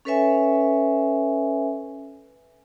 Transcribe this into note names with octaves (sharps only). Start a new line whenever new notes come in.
C#4 A4 B4 C#5 E5 G#5